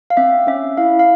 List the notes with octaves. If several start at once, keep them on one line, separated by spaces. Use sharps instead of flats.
F5
C4 E5
C#4 E5
E4 F5
F5